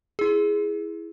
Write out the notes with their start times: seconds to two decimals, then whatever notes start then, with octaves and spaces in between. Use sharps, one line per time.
0.19 E4 G#4